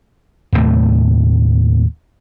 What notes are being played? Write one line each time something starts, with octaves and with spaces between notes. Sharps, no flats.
D#2 A2 C3 A3